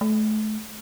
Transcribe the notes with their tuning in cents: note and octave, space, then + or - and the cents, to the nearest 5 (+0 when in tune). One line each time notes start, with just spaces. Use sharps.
A3 -35